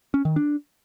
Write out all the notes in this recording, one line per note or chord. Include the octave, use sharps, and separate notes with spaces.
C#4
D#3
D4